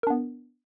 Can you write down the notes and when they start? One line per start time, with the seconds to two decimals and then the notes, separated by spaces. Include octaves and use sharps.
0.03 A#4
0.07 D4
0.10 B3